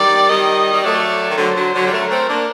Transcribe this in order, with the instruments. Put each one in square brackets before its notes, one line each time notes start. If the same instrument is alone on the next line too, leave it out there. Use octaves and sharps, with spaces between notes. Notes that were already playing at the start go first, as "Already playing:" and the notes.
Already playing: [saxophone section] D#3 G3 [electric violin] D5
[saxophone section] D#3 G3 [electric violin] D#5
[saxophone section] G3
[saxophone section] F#3 A3 [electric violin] D5
[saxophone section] D#3
[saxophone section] D3 F#3 [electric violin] C5
[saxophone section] D3 F#3
D3 F#3
G3
[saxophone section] F#3 A3 [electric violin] A#4
[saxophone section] A3 C4
A#3 D4